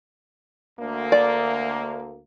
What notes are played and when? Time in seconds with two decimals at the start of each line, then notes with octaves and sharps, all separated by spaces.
0.79 D2 A#3
1.12 D5